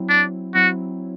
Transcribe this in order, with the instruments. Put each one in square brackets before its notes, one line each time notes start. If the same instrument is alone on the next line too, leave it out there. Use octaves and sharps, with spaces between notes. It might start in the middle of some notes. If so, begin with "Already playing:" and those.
Already playing: [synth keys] F#3 C4 E4
[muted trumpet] D4
[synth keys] F#3 C4 E4 [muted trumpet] F#4